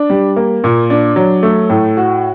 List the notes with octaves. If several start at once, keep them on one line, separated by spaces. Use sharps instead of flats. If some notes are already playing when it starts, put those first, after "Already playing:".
Already playing: D4
G3
A#3
A#2
D4
F#3
A3
A2
F#4